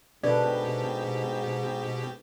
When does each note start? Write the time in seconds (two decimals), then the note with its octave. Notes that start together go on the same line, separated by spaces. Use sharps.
0.23 G#2 B2 D4 G4 A4 B4 D5